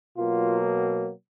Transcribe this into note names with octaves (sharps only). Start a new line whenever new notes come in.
B2 F#3 A#3 F4